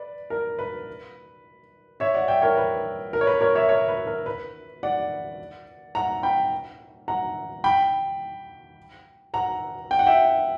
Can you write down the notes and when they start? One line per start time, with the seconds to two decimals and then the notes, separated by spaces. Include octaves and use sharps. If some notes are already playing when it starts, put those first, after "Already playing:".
Already playing: B4 D5
0.30 A#4
0.59 B4
2.00 C#5 E5
2.14 D5 F#5
2.28 E5 G5
2.42 A#4 C#5
2.57 B4
3.13 A#4
3.21 C#5
3.27 B4
3.41 A#4 C#5
3.55 C#5 E5
3.69 A#4 C#5
3.88 B4
4.07 A#4
4.26 B4
4.83 D5 F#5
5.95 F#5 A#5
6.23 G5 B5
7.08 F#5 A#5
7.64 G5 B5
9.34 F#5 A#5
9.91 G5
9.99 F#5
10.07 E5 G5